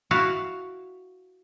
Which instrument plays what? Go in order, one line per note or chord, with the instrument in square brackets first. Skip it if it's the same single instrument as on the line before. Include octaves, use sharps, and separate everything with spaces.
[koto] E4 F#4 F5